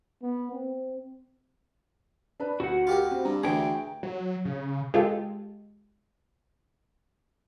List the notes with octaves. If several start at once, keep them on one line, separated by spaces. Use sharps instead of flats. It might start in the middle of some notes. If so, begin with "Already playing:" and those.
B3
C4
D4 B4
D2 F#4 F#5
F4 G4 A#4
C4
G2 A#5
D2 E3 G#4 G5
F#3
C#3
G#3 F4 G4 A4